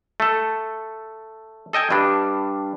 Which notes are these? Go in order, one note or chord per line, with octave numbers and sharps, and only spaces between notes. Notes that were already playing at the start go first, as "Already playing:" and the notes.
A3 A4
A4 D#5 G5 G#5
G2 G3 D4